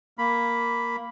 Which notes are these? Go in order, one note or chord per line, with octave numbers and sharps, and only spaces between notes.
A#3 B5